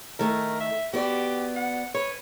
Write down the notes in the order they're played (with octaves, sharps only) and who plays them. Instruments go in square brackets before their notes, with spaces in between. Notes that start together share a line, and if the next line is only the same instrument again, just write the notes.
[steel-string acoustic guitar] D#3 A3 [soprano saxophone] A#4
[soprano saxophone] E5
[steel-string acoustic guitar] B3 F#4 D5 [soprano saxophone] G4
[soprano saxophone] F#5
[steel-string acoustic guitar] B4 [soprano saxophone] C#5